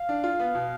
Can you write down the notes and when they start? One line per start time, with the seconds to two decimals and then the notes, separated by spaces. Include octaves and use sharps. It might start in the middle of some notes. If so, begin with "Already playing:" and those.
Already playing: F5
0.09 D4
0.24 F4
0.40 B3
0.55 B2